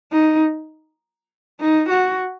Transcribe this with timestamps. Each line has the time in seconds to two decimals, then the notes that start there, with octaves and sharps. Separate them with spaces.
0.12 D#4
1.60 D#4
1.89 F#4